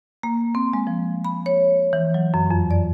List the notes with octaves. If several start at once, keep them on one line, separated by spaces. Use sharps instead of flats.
A#3
C4
G#3
F3
B5
C#5
E3
F#3
F#2
F2
D5